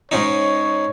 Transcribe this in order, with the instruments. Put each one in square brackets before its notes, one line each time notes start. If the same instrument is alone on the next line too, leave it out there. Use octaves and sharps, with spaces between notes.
[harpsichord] G#2 C#4 D#4 [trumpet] C#5